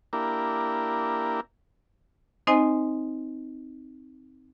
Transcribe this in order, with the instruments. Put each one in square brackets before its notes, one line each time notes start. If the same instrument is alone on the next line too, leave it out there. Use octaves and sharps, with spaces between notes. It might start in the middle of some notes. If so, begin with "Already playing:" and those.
[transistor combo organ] A#3 D4 E4 G4 A#4
[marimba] C4 D#4 C5 D#5 G#5